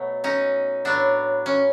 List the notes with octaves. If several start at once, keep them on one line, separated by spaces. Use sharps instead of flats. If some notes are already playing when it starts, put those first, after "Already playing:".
Already playing: B2 F#3 A3
C#4 D#4
A2 F#3 B3 D4
C#4